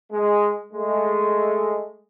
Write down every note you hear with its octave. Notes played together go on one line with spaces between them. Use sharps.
G#3
G#3 A3